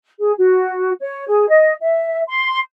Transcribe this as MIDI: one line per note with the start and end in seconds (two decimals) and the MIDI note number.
0.19 0.31 68
0.37 0.91 66
0.99 1.25 73
1.27 1.48 68
1.48 1.73 75
1.81 2.20 76
2.26 2.58 84